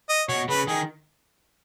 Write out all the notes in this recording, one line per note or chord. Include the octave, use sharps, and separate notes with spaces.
D#5
B2 C#5
C#3 B4
D#3 G#4